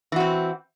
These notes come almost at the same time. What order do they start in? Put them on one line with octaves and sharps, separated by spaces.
E3 F#4 C4